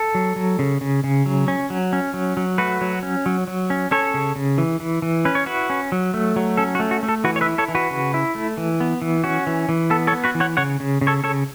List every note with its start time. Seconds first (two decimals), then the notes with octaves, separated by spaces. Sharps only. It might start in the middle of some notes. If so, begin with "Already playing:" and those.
Already playing: A4
0.15 F#3
0.36 F#3
0.59 C#3
0.81 C#3
1.04 C#3
1.26 F#3
1.48 C#4
1.70 F#3
1.93 C#4
2.14 F#3
2.37 F#3
2.58 A3 F#4 B4
2.81 F#3
3.03 C#4
3.26 F#3
3.47 F#3
3.70 C#4
3.91 C#4 A4 C#5
4.14 C#3
4.36 C#3
4.58 E3
4.80 E3
5.02 E3
5.25 C#4 B4
5.35 C#5
5.46 E4 F#4 B4
5.70 C#4
5.92 F#3
6.14 A3
6.36 F#3
6.57 C#4 A4
6.75 F#4
6.80 A3
6.91 F#4
7.03 A3
7.09 A4
7.24 E3 F#4 B4
7.36 C#5
7.41 B4 E5
7.46 E4
7.58 A4 C#5
7.69 E3
7.75 F#4 B4
7.91 C#3
8.14 E4
8.35 A3
8.58 E3
8.80 B3
9.02 E3
9.24 C#4 F#4
9.47 E3
9.69 E3
9.90 B3 A4
10.07 A4 C#5
10.12 B3
10.24 F#4 B4
10.35 E3
10.40 C#5 F#5
10.57 C#3 C#5 F#5
10.80 C#3
11.01 C#3
11.07 A4 C#5
11.24 C#3 A4 C#5